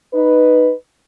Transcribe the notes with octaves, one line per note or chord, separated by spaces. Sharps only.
D#4 B4